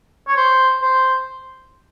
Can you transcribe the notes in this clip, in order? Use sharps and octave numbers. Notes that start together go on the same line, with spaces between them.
C#5
C5
C5